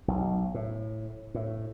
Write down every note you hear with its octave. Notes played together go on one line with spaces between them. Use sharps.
B1
A2
A2